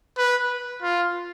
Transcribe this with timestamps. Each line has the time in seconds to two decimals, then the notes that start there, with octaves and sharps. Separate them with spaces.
0.18 B4
0.83 F4